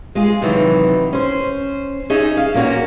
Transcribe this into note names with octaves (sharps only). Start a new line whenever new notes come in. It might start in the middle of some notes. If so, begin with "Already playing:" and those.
G#3 F4 G#4
C3 D#3 E3 F#3
C#4 C5
C#4 D#4 G#4 E5
F5
A#2 A#3 C#4 F#4